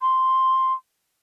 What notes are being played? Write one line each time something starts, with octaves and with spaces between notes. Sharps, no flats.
C6